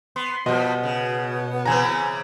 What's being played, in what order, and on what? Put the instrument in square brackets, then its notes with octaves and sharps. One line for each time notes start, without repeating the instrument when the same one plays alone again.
[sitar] B3 [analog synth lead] C6
[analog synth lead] B2 [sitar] F3 G3 [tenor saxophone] B3 [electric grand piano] D#5
[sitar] C#3
[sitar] C#3 E3 C4 [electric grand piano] G#5 A#5